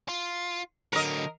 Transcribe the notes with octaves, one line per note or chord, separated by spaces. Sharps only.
F4
D3 F#3 A#4 D#5